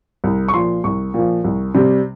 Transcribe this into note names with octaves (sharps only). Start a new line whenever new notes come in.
C2
C#6
A#2 F3 C6
C2 C#6
A#2 F3
C2
C3 G3 C4